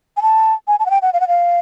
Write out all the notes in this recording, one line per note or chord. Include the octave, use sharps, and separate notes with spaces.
G#5
A5
G#5
A5
F#5
G5
F#5
F5
F#5
F5